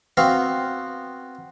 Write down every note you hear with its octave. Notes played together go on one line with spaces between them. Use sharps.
B3 C4 F#4 F5